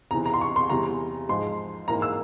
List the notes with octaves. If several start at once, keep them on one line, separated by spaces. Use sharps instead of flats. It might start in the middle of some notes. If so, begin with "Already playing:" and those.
E2 C3 E3 A#5
A#5
C6
C#6
C6
E2 C3 E3 G3 A#5
G#2 F3 G#3 C6
G#2 E3 A#3 A#5
E6